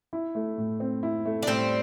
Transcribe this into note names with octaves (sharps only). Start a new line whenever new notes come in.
E4
A3
A2
C4
E4
A3
D4
A2 G3 C4